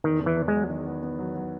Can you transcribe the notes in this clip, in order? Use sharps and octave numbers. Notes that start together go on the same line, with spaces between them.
E2 D#3
E2
E3
E2
F#3 G#3
D#3
B3
B3
F#3
F#3